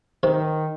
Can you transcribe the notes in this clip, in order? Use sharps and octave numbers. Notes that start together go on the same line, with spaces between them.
C3 D#3